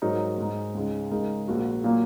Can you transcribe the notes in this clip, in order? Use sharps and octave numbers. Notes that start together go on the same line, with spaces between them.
G#2 F#3 D#4 A#4 C#5
G#2 G#3 D#4
C#2 C#3 G#3 D#4
C#2 C#3 G#3 D#4 A#4
A#1 A#2 A#3 F#4 A#4
A#2 F#3 A#3